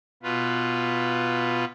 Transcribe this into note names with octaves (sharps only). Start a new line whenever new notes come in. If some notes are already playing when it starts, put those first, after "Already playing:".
B2 F4 B4